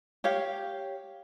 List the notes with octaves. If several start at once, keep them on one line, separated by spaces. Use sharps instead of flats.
G4 C#5 F5